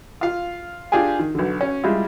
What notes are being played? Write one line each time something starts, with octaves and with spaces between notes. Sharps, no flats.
F4 F5
D4 F4 G4 G#4 G#5
D#3
B1 D3
C#4
G3 G#3 E4 F4